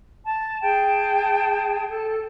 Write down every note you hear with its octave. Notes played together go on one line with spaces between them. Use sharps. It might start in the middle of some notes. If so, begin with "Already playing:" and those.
A5
G#4 G5 A5
A4